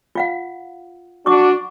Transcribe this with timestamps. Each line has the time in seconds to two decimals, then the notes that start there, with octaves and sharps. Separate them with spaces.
0.15 F4 F5 F#5
1.26 D4 F#4 C#6 D6